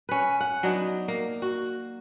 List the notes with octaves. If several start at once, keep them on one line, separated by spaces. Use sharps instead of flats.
C#4 B4
F#5
F#3 B3 D4 D#4
A#3
F#4